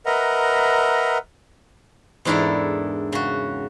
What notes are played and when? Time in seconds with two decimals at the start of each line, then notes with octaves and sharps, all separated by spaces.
0.06 A#4 B4 D#5 E5 F#5 A#5
2.25 E2 G#2 D4 E4 A4 A#4
3.12 C#3 F#4